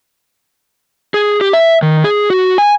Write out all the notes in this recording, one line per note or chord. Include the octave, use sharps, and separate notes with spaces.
G#4
G4
E5
D#3
G#4
F#4
G#5